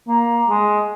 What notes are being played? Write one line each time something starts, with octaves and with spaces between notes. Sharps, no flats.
A#3
G#3